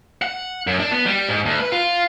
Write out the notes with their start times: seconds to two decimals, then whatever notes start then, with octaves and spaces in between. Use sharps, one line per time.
0.22 F#5
0.67 F#2
0.79 D4
0.91 B3
1.06 G3
1.29 G#2
1.45 D2
1.59 B4
1.72 F4